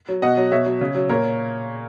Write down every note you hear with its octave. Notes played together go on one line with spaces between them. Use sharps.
F#3
B2 D#5 F#5
F#3
B2 C#5 E5
F#3
C#3
F#3
A#2 A#4 C#5